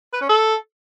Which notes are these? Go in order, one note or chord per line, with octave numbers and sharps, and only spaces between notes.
B4
C#4
A4